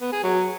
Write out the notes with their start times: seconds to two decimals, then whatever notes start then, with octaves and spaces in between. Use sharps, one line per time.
0.01 B3
0.12 G#4
0.24 F#3